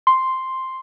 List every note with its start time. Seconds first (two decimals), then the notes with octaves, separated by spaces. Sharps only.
0.07 C6